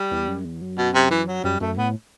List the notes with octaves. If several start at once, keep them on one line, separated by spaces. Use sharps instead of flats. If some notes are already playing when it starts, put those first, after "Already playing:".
Already playing: G3
E2
F#2
E2
F#2
B2
C3
E3
F#3
F#2 G3
F#2 A3
A2 B3